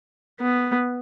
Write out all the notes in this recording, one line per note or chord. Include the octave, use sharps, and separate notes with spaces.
B3